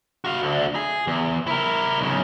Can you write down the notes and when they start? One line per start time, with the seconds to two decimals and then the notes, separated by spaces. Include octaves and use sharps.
0.25 F#4 F5
0.42 D2 D3
0.75 G#4
1.07 E2
1.47 E4 A#4
1.99 B1 C#3